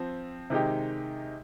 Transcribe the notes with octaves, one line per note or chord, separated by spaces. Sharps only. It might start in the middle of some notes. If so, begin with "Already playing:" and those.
Already playing: F3 C4
C3 D#3 G#3 D#4 G4